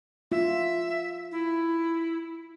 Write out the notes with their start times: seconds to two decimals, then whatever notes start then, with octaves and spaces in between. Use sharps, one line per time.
0.32 F4 E5
1.32 E4